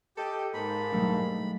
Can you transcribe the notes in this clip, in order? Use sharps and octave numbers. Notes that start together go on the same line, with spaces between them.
G4 A4 D#5 G5
G#2 A#3 A5 B5 G6
B2 F#3 G3 A3 D4 D#4